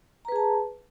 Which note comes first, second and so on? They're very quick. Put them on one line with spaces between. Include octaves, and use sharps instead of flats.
A#5 B4 G#4 A5